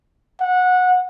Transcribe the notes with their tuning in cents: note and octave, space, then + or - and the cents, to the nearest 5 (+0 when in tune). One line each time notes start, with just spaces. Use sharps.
F#5 -20